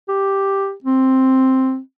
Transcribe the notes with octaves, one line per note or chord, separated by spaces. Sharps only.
G4
C4